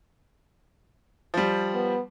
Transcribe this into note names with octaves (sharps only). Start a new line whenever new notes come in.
F3 G3
B3